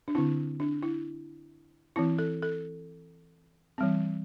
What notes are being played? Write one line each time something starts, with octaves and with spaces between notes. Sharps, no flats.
D4
D3 C4 E4
D4
E4
E3 C4 E4
A4
A4
E3 G3 C4